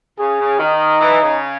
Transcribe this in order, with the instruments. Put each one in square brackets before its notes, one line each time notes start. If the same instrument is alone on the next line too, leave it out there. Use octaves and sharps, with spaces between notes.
[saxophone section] C#3 [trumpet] G#4
[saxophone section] C#3
[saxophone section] D#3 [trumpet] D#4
[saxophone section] E3
C#3